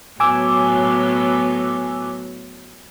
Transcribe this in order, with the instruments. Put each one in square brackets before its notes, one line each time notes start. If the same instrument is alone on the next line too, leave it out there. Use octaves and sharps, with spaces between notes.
[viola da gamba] A2 F#3 B3 [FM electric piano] G#5 D6 E6